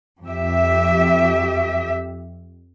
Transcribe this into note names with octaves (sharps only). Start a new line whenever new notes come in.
F2 G4 E5